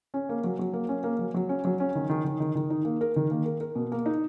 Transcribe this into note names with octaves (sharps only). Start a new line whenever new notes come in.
C#4
A#3
F#3
F#3
A#3
C#4
A#3
F#3
F#3
C#4
F#3
C#4
D#3
D#3
D#3
D#3
D#3
D#4
A#3
A#4
D#3
A#3
A#4
A#4
B2
A#3
D#4